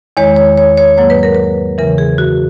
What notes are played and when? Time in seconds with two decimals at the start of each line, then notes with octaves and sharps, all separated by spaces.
0.17 E2 D#3 G#3 C#5
0.36 C#5
0.58 C#5
0.78 C#5
0.98 G#2 F#3 A#3 C#5
1.10 B4
1.23 A#4
1.35 B4
1.78 E2 C#3 E3 A#4
1.98 G#4
2.18 F#4